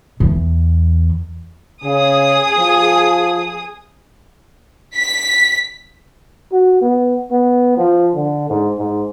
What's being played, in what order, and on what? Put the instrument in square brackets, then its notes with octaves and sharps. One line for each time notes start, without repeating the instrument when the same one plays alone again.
[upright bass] E2
[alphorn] C#3 [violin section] G#4 D#6
[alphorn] F3
[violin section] B6
[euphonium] F#4
B3
B3
F3
D3
G#2
G#2